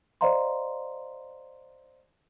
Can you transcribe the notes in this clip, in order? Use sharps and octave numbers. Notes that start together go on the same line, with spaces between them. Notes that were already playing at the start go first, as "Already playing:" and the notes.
C5 D5 D#5 F5 A#5 C6